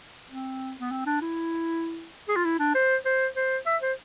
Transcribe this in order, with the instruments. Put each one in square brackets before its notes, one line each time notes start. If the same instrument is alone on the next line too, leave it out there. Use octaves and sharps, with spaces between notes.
[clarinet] C4
B3
C4
D4
E4
G#4
F4
E4
D4
C5
C5
C5
E5
C5